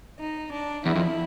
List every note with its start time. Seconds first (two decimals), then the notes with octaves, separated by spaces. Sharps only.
0.19 D#4
0.52 D4
0.85 E2 E4
0.95 F2